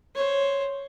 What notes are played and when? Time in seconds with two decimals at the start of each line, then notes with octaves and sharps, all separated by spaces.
0.15 C5 C#5